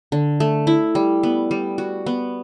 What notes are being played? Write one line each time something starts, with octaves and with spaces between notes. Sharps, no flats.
D3
A3
E4
G3
B3
G3
F#4
B3